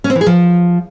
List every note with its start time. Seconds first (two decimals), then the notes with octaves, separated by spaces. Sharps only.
0.04 C#4
0.10 C4
0.15 E3
0.21 G#4
0.26 F3